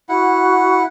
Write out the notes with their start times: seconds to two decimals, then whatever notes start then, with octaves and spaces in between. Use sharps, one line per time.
0.09 E4 F#4 F#5